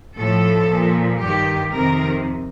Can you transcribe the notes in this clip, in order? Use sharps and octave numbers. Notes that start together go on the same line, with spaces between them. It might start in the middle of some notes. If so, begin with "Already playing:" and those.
A2 F3 A4
A#2 F3
G2 D#3 G4
F2 C3 D#3 A#4